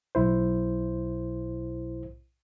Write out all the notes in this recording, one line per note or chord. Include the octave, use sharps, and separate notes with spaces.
B1 E4 C5